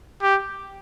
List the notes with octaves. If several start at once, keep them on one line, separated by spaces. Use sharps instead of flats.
G4